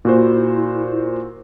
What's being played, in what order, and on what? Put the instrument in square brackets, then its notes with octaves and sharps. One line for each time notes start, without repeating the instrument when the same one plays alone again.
[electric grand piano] A#2 F#4 C5 [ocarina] E4